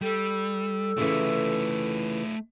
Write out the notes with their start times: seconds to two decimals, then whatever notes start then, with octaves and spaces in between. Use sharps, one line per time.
0.01 G3 A4
0.98 C#3 E3 A3 F4